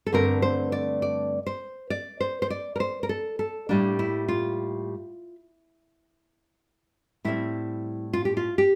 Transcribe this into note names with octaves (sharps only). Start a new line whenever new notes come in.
A4
G2 D3 A3 C4 A#4
C5
D5
D5
C5
D5
C5
C5
D5
A#4
C5
A#4
A4
A4
A2 G3 A#3 D4
E4
F4
A2 G3 C4 E4
F4
G4
F4
G4